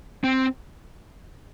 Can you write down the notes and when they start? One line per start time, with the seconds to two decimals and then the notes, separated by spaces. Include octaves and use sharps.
0.24 C4